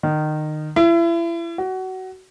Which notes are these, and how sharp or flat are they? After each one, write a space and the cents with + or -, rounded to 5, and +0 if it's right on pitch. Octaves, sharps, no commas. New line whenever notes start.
D#3 -25
E4 +35
F#4 +20